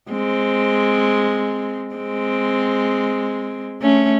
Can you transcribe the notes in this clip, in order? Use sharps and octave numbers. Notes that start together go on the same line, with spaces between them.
G#3 C4
G#3 C4
A3 C#4